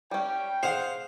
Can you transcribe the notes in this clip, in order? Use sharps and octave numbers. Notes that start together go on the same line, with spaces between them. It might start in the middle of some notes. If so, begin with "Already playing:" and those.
G3 C#4 G5
G#4 C5 F5 F#5